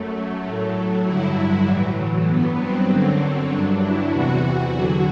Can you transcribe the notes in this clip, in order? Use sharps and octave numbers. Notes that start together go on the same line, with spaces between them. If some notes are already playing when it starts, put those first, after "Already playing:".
Already playing: F#2 F#3 A3
A2 F#3
G2 D3 F#3 E4
E4
A2 E3 F#3
G2 F#3 B3
C4
F#2 D3 F#3
C4
G2 F#3 D4
E4
E2 C3 E3 F#4
E2 D3 F#3